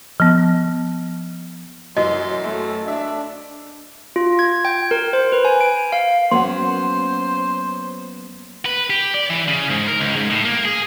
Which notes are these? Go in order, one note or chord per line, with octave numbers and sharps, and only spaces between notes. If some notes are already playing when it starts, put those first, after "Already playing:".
F3 B3
F#2 E3 D#5 C6
A3
D4 E5
F4
G#6
G5
A#4
C5
B4
G#5
D7
F5
F#3 A#3 B3 C#4 C5 F#5 C6
B4
G4
D5
E3
C#3
G#2
A#4
C#2
G#2
A2
A#3
G#4